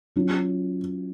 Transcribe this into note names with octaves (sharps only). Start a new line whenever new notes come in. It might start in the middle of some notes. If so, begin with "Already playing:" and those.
F#3 C#4 F4